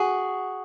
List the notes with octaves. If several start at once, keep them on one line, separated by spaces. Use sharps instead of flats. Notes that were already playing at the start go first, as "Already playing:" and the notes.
Already playing: F#4 G#4